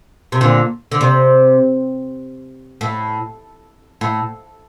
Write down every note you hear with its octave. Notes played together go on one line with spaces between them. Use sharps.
C3
A#2 D3
D3
C3
A2
A2